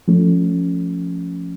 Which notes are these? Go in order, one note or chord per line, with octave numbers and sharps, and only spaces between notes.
F3 A3 C#4